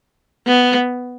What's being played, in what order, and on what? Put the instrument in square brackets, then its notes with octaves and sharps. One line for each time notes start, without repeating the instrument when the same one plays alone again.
[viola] B3